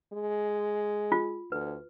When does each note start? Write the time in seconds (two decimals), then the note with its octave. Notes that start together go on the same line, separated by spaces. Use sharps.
0.13 G#3
1.12 F4
1.52 D2 B4